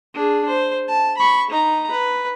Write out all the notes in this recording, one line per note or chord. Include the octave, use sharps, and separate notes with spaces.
D4 G#4
C5
A5
B5 C#6
D#4 A#5
B4